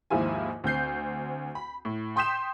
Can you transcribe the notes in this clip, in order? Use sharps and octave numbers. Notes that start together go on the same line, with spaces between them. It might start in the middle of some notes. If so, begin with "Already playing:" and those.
D#2 G#2 F3 E4 F4 G#5
D2 C4 G6 C7
B5
A2
G5 C6 D#6 G6 B6 E7